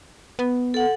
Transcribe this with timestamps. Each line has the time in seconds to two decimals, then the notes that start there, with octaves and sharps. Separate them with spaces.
0.39 B3
0.74 A4 F#5